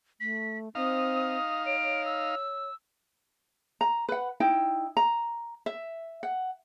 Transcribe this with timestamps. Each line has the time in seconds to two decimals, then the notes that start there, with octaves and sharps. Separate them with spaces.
0.20 A3 B6
0.75 C4 D#4 F5 D#6
1.66 C#5 D7
1.83 C#5
2.05 E6
3.81 A#5
4.09 B4 F#5
4.40 D#4 E4 G5
4.97 A#5
5.66 E5
6.23 F#5